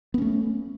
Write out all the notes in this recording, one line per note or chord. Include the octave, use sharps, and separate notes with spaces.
A3 B3 C#4